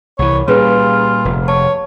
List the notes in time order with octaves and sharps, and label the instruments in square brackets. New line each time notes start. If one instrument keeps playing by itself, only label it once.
[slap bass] C2 E3 [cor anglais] C#5
[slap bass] A#2 G3 [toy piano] C#4 G#4 B4 [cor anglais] F4
[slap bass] F1
[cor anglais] C#5 [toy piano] A5